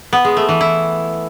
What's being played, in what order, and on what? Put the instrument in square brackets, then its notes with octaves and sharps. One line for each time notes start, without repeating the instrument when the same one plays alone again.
[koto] B3
G#3
A3
E3
E4